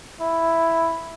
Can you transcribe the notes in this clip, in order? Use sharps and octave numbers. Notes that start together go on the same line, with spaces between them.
E4